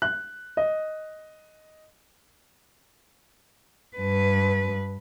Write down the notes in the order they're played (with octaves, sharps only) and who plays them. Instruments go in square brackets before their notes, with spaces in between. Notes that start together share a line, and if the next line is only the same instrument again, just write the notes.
[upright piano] F#6
D#5
[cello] G2 B4